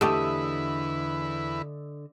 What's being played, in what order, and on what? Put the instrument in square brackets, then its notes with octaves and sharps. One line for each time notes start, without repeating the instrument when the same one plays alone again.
[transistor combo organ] E2 E4 B4 [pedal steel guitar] D3 D#5 E5 [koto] A3 G4